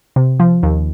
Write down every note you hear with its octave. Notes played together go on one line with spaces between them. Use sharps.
C3
F3
D#2